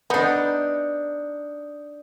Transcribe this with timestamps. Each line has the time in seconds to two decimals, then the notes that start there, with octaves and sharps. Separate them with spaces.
0.10 B3 D4 D#4 D#6 G6 C#7